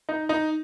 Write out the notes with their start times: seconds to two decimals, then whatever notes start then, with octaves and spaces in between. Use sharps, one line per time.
0.09 D#4
0.29 D#4